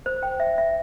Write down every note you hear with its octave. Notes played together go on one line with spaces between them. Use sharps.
C5
G5
E5
E5